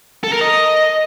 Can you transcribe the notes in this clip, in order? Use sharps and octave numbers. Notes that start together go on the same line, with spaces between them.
A4
A#4
D#5